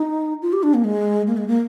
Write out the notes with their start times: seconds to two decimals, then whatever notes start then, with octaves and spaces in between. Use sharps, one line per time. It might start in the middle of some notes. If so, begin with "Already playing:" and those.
Already playing: D#4
0.42 F4
0.53 G4
0.63 D4
0.74 A#3
0.84 G#3
1.27 A#3
1.37 G#3
1.48 A#3